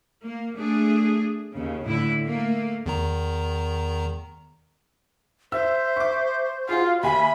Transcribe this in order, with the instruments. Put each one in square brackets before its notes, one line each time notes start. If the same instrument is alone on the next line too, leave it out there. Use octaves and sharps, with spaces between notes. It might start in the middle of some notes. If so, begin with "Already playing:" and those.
[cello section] A#3
A3 D4 G#4
D#2 C#3
A2 D3 E4
A3 A#3
[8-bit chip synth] E2 D#3 A#5
[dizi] C5 [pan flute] E5 [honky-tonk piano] E6
[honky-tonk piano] C#6 D6
[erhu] F4 [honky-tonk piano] F#4 G#4 [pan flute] F5
[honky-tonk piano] D#2 G#5 [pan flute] E5 [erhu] B5